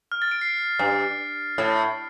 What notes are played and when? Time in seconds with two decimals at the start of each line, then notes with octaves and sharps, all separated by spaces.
0.12 F6
0.22 A6
0.31 D7
0.41 C7
0.79 G2
1.58 A2